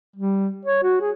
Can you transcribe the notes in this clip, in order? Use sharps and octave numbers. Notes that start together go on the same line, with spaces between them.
G3
C#5
F#4
G#4